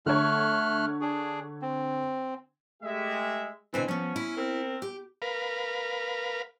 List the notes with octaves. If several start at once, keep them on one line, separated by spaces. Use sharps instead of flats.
D3 A3 C#5 F6 F#6
D4 G#4
C4
G#3 A3 G4 E5
B2 D3 E3 C4 G#5
F3 B3 C#4
E4
C4 A#4
G4
A#4 B4 F5